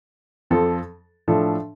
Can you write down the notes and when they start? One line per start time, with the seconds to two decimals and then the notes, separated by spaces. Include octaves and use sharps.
0.50 F2 F3 C4 A4
1.28 A2 F3 D4 A4